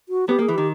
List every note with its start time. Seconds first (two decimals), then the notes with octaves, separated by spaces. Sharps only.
0.09 F#4
0.28 B3 G4
0.39 A#3
0.42 G#4
0.48 E3
0.54 D#3 G4